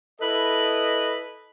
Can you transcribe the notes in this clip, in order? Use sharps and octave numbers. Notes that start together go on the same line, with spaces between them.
E4 A4 B4 D#5